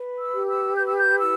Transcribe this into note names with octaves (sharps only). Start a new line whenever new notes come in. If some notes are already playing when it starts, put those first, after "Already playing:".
Already playing: B4
E6
G4
E6
B4 G6
E6
G6
E4 E6